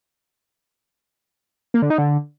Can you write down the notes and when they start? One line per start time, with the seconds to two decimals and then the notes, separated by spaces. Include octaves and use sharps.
1.74 A#3
1.82 D3
1.90 D#4
1.98 D3